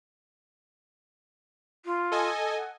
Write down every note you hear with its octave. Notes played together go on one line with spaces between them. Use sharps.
F4
A4 D#5 G#5
F#5